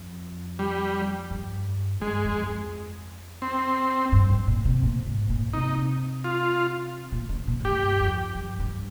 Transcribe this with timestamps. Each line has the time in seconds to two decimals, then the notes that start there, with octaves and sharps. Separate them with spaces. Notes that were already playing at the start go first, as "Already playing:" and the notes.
Already playing: F2
0.59 G3
1.30 G2
2.00 G2 G#3
2.25 F2
2.48 F2
3.42 C4
4.12 G2
4.30 G#2
4.48 A#2
4.65 C3
4.83 A#2
5.06 G#2
5.30 A#2
5.53 C3 D#4
6.24 F4
7.12 A#2
7.29 C#3
7.47 A#2
7.60 G#2
7.65 G2 G4
8.00 F2
8.35 G2
8.59 G2